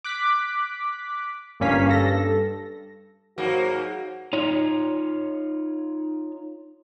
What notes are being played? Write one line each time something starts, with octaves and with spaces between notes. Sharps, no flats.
D6 F#6 B6
G1 G2 A#3 C#4 F5 B6
G2 A4 A#6
G#2 F#3 A#3 F#4
D#4 F4 C#5